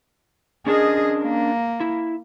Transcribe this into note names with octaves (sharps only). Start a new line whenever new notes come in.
C#4 D4 G#4 A#4 D#5
A#3
E4